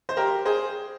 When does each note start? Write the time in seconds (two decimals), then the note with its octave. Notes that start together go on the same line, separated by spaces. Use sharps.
0.09 C5
0.17 G4 A#4
0.46 G#4 C5